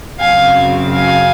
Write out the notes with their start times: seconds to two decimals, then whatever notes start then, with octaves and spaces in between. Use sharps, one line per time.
0.19 F#2 C#3 F#3 C4 F5 G#5
0.93 F5 G#5